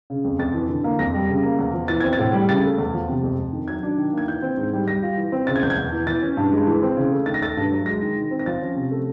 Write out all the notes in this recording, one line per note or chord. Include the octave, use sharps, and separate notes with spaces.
C#3
F2
F2 A6
E3
D3
A#3
F2 A#6
G3
C#3
A#3
E2
F3
E3 A6
C4 G#6
A6
A2
G3
C#3 A6
A3
E2
F3
C3
F2
F2
D#3
F#3 G#6
D4
D#3
A#3 G#6
E3 G6
C4
G#2
G3
G3 A#6
F4
E3
C4
C#3 A6
G#6
E2 G6
G#6
E2
E3
E3 A6
C#4
G2
G#3
E3
C4
C#3
A3
D#3 A6
A#6
A3 A6
G2
F#3
G#3 A#6
D#3
D#3
C4
A#6
F3 A6
C#4
C3
A3